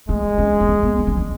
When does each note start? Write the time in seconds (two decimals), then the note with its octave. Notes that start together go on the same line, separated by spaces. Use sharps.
0.09 G#3 A3
0.38 C#4
0.60 B3
0.68 C#4
0.83 B3
0.99 D4
1.07 C#4
1.17 D4